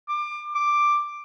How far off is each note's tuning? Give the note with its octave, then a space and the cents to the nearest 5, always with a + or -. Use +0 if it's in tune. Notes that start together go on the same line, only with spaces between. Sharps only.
D6 +25
D6 +5